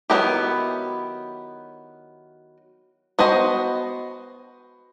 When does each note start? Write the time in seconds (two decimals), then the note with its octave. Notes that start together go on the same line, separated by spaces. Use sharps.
0.10 D#3 F#3 B3 E4 G4
3.19 B3 F#4 C5 D#5